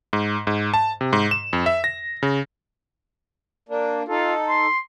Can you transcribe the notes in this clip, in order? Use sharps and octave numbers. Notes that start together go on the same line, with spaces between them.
G#2
G#2
A5
C3
G#2
E7
F2
E5
A#6
C#3
A#3 D4
D#4 F4 A4
C6